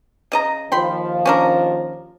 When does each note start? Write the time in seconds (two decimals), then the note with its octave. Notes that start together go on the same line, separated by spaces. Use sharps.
0.32 C#3 D#5 A#5
0.72 D#2 D#3 F3 G5 B5 C6
1.25 C#4 D4 A#4